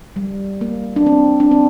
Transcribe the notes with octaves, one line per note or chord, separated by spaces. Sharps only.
G3
A#3
D4
C4
D4
C4